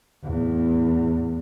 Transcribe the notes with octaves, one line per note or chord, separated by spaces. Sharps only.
E2 A2